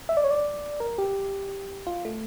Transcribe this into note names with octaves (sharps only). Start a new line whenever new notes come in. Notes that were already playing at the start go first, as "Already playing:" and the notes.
E5
D5
C#5
D5
A#4
G4
F4
A3